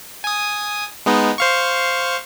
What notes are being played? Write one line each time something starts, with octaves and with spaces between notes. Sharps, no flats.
G#5 D#6
G#3 B3 D#4
C5 F5 C#6